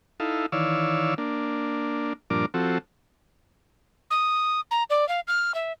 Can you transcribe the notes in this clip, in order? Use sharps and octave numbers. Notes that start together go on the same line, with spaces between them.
D#4 E4 A4 F5
D#3 E3 C#5 D5 F5 E6
A#3 D4
G2 A#2 F3 D4 A#4 D6
F3 C4 F#4 A4
D#6
A#5
D5
F5
F6
E5